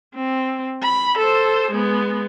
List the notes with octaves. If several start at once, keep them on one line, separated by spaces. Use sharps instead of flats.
C4
B5
A4 C5
G#3 B3